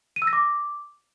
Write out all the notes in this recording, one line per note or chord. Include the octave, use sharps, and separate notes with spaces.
D#7
E6
A#6
D6